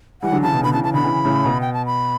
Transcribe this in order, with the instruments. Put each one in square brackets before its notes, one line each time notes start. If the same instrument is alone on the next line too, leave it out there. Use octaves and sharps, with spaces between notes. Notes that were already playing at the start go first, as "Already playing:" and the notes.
[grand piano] E3 G3 [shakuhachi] F#5
[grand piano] D3 F#3
[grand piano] C#3 E3 [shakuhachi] A5
[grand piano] B2
C#3
[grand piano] B2 D3 [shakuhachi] B5
[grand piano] C#3 E3 [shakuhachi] A5
[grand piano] C#3 E3 [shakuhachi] A5
[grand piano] B2 D3 [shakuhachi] B5
[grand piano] C#3 E3
A2 C#3
B2
[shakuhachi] G5
A5
B5